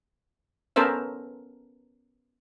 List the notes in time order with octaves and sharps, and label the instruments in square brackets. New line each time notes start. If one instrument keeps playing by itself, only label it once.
[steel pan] B3 C#4 A4 A#4 C5 E5